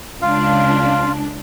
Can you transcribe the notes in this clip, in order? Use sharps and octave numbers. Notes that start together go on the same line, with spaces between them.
C#2 D4 F4 F5